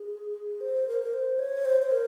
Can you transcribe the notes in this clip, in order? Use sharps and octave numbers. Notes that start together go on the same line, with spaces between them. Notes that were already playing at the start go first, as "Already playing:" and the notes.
Already playing: G#4
C5
A#4
A#4
C5
C#5
C5
C5
A#4